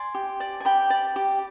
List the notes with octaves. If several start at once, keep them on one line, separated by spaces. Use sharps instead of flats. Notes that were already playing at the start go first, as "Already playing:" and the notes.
Already playing: D5 G#5 C6
G4
D5
G#5
G4 G5 B5
D5
G4